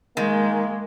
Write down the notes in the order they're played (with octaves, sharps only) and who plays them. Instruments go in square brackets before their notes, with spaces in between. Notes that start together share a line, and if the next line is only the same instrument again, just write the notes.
[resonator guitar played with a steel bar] D#3 [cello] G#3 [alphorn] A#3